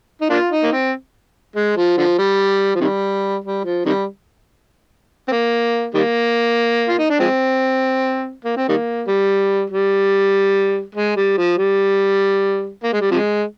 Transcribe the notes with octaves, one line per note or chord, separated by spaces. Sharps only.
D#4
A#3 D4 F4
D#4
A#3
C4
G#3
F3
D3 F3
G3
F3
C3 D#3 G3
G3
F3
C3 D#3 G3
C4
A#3
D#3 G3 A#3
F4
D#4
D4
F3 G#3 C4
A#3
C4
D#3 G3 A#3
G3
G3
G#3
G3
F3
G3
A#3
G#3
G3
C3 F3 G#3